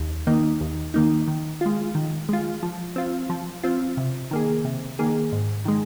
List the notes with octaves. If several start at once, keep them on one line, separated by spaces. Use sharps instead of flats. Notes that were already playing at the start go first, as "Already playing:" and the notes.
Already playing: D#2
D#3 A#3 D#4
D#2
D#3 A#3 D#4
D#3
G#3 F4
D#3
G#3 F4
F3
C4 F4
F3
C4 F4
C3
D#3 A#3 G#4
C3
D#3 A#3 G#4
G#2
D#3 G#3